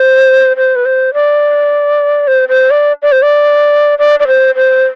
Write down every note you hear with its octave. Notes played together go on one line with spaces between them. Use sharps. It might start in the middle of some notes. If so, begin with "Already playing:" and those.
Already playing: C5
C5
B4
C5
D5
C5
C5
D5
D5
C5
D5
D5
D5
C5
C5